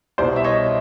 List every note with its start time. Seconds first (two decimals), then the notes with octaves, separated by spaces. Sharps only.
0.18 C2 B2 C5 D5
0.36 E5
0.44 C#5 D#5